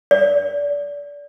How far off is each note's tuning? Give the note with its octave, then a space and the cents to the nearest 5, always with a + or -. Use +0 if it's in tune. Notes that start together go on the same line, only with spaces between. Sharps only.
D5 -25